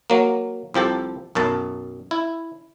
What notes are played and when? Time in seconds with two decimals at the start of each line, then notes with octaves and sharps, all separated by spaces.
0.10 F#3 A#3
0.74 C2 F3 G4 A4
1.35 B1 F#2 A5
2.11 E4